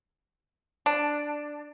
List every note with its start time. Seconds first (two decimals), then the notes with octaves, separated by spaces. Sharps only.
0.86 D4